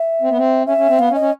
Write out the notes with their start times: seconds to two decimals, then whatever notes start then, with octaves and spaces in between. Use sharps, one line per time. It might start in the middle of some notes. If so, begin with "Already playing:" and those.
Already playing: E5
0.22 C4
0.30 B3
0.37 C4
0.67 C#4 E5
0.77 C#4
0.89 C4
0.99 B3 F5
1.10 C#4
1.15 D#5
1.20 C#4